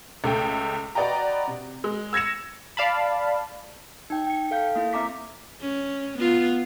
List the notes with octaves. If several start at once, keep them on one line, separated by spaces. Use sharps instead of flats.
C#2 A3 G5
F#4 B4 D5 D#5 G5 A#5
C3
G#3
E6 G#6 A#6 C#7 E7
D5 F5 A5 B5
D#4 G5
G5 C#7
A4 F5 G6
A#3 E4
C4 E5 A#5 D6 B6
C#4
B3 F4